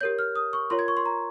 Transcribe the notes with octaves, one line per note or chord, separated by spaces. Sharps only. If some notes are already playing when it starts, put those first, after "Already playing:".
G4 A#4 C#5 G6
F6
D#6
C#6
F4 A#4 C#5 C6
G#6
C#6
C6
A#5